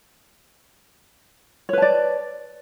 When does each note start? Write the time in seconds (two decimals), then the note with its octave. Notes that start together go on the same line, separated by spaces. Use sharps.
1.69 C#5
1.73 B4
1.78 A5
1.82 D5